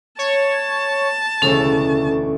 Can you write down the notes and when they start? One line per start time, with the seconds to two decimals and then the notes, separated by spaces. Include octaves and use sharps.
0.19 C#5 A5
1.42 E1 D2 C#3 C#4 A4